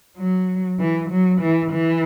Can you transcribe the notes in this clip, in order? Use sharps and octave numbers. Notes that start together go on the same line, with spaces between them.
F#3
E3
F#3
E3
E3